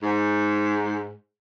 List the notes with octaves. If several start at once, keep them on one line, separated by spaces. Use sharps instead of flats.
G#2